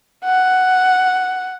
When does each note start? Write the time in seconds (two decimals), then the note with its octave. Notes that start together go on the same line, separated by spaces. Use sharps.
0.24 F#5